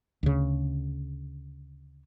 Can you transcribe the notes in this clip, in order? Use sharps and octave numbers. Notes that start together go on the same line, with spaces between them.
D2 C#3